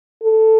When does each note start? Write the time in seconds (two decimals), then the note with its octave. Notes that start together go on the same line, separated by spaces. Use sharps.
0.23 A4